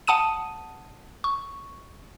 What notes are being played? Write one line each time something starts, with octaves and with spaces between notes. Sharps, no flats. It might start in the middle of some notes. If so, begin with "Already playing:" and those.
F#5 A5 D#6 D#7
C#6